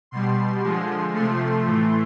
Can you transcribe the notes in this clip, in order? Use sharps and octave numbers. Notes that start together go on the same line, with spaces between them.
B2 G3 C6
D3 F3 G#3
C3 F3 A3 C6
A2 E3 A3